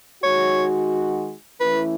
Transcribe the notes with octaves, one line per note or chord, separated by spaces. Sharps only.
D#3 G#3 D#4 F#4 C#5
E3 A3 C#4 E4 B4